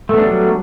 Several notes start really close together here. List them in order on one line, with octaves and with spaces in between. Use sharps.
A3 B3 D4 G3 F#3